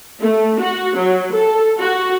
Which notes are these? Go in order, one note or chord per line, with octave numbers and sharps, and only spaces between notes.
A3
F#4
F#3
A4
F#4